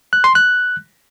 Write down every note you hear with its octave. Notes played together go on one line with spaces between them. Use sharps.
F#6
C6
F#6